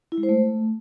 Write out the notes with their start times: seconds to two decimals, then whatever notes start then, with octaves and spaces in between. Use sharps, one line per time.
0.12 E4
0.18 G#3
0.23 C5
0.29 A3